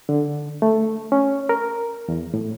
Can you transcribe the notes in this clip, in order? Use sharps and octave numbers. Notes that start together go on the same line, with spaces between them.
D3
A3
C#4
A#4
E2
A2